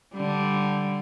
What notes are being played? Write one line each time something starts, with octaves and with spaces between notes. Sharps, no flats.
D3 G3